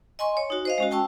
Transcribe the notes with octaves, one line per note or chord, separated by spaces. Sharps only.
D#5 G#5 C6 C#6
C#5
D#4 F#4
C5 D#5 F5
G#3 C#4 F#4
G5 A5 C#6 E6